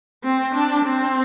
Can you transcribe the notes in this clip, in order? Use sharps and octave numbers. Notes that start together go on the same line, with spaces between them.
C4
D4
C4